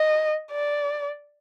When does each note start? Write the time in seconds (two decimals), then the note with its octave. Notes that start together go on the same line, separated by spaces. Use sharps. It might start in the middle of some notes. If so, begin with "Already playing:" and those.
Already playing: D#5
0.52 D5